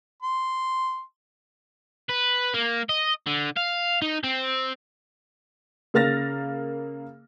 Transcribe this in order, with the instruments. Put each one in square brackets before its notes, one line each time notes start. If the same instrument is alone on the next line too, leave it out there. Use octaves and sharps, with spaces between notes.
[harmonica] C6
[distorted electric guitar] B4
A#3
D#5
D3
F5
D#4
C4
[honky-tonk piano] C#3 A#3 F6 A6 A#6